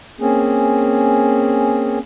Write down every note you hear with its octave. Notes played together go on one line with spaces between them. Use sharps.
A#3 C4 C#4 G#4